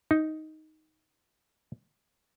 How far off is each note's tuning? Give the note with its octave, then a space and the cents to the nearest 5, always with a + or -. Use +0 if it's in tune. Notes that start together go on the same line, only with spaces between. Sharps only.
D#4 +5